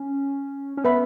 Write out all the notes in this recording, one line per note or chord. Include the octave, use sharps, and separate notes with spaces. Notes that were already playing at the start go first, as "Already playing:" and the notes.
Already playing: C#4
C#4
B3 B4 E5 B5